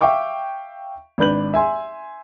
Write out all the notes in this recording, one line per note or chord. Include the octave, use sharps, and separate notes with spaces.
E5 F5 G5 C#6 D6
G#1 D4 B4 G6 F#7
E5 G#5 C6